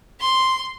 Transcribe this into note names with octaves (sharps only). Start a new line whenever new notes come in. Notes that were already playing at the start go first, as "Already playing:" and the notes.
C6